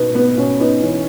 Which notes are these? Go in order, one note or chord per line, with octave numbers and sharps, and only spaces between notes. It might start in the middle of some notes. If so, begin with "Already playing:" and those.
Already playing: B2 B3 D#4
B3
B2 C#4
B3 D#4
E3 C#4